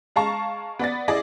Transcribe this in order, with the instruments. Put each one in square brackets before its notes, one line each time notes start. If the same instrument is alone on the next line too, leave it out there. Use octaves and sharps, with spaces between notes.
[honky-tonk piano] G#3 F5 A5 A#5 C#6
B3 D5 A6
E4 G#4 D5 D#5